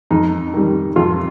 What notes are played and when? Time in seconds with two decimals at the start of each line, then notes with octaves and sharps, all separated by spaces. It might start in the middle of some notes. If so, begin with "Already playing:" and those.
0.11 F2 D#4
0.54 D#3 G3
0.96 F2 F4